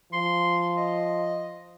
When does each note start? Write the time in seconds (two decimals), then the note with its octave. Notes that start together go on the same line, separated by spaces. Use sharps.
0.13 F3 C6
0.77 D#5